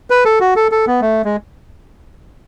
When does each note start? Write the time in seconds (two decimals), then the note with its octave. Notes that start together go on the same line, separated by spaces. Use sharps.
0.10 B4
0.25 A4
0.40 F#4
0.56 A4
0.72 A4
0.87 B3
1.01 A3
1.25 G#3